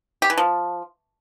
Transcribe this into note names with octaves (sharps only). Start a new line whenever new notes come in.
G4
E3
F3